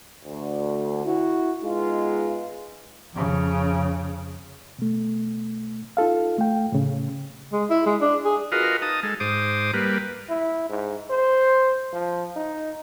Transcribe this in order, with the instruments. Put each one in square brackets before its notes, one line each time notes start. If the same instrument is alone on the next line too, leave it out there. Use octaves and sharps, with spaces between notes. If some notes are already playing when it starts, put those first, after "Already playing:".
[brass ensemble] D2
E4 F#4
G#3 B3 D#4 F4
[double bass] F2 C#3
[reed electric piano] B2 A3
D#4 F4 A4 F5
A3 G5
A2 C#3
[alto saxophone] G#3
E4
G#3
D4
G#4
[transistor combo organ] F4 F#4 A#4 B4 D#5 F5
D#4 A5 D#6
G#3 A4
G#2 C5 D6 D#6
G3 A#3 B4
[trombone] E4
G#2
C5
F3
D#4